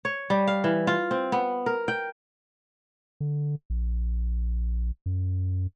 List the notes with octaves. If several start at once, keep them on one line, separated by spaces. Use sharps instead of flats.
C#5
G3
F5
E3
F4
C4
B3
A#4
G5
D3
A#1
F#2